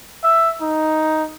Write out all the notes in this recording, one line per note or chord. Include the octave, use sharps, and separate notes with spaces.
E5
D#4